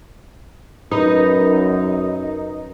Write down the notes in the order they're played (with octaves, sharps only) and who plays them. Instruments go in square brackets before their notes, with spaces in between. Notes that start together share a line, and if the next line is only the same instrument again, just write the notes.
[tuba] F#2 [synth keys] D#4 [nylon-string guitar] B4